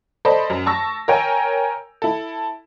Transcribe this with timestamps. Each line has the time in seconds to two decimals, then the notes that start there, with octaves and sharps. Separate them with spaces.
0.25 A4 C5 D5 D#5 B5
0.50 F#2
0.66 A5 C#6 E6 A#6
1.08 A#4 C#5 G5 G#5
2.02 E4 A4